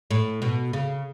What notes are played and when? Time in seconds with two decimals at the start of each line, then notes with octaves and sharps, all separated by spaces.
0.11 A2
0.42 B2
0.73 C#3